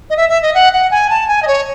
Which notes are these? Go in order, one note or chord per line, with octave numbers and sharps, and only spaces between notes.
D#5
E5
E5
D#5
F#5
F#5
G#5
A5
G#5
D#5
C#5